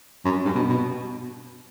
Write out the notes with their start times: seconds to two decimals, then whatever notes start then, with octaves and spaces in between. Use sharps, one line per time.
0.25 F#2
0.45 G2
0.55 B2
0.69 B2